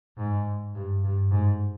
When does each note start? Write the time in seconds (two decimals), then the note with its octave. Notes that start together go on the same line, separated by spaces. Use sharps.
0.18 G#2
0.75 G2
1.04 G2
1.31 G#2